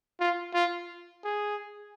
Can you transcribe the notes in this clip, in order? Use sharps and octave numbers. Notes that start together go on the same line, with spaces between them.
F4
F4
G#4